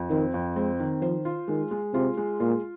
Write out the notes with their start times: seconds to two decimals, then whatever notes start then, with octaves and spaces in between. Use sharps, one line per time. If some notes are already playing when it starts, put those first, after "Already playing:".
Already playing: F2
0.10 D#3 C4
0.34 F2
0.56 G#3 C4
0.80 D#3
1.02 F3 C5
1.25 F4
1.48 D#3 G#3
1.71 G#3
1.93 C3 F4
2.17 G#3
2.40 A#2 F4